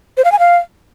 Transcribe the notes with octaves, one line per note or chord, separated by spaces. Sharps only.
C5
F5
G#5
F5